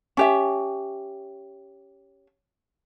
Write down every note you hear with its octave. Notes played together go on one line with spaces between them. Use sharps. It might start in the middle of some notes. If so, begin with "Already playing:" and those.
C#4 G4 E5